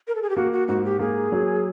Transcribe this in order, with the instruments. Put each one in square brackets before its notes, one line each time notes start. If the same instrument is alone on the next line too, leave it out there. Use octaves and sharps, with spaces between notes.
[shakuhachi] A#4
A4
G#4
G4
[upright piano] A#3 [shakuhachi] F#4
[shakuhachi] F#4
[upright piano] G#2 [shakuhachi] F#4
[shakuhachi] G4
[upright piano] A#3 [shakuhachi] G#4
[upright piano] F#3